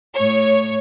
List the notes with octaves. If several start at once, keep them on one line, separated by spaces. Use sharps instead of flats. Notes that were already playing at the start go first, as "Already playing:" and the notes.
A2 C#5